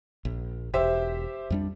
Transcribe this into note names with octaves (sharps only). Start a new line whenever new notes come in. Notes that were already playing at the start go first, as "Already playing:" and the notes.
A#1
E1 G4 C5 E5
F2 G3 D4